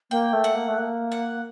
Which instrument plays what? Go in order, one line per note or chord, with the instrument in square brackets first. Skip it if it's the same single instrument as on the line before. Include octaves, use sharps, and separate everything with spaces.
[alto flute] A#3 [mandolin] G5
[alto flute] A3
[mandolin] F#5
[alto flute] A#3
A3
A#3
[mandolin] F#5